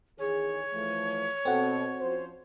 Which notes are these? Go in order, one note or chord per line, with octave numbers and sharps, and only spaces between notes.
E2 D#3 G#4 C#5
E3 F3 A3
B2 C4 F#4 A4
F3 C#4 C5